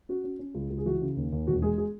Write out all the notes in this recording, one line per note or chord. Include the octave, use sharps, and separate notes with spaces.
C#4 F#4
C#4
C#4
C#2
C#2
G#4
E3 F#4
C#3
D#2
D#2
E1 F#4
G#3 G#4
G#4